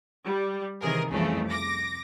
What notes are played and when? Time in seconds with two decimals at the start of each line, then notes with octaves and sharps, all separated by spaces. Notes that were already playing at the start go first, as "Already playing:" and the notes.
0.24 G3
0.82 C3 D#3 E3 G#4 A#4
1.11 C2 F2 C#3 E3 A3
1.49 D6 A#6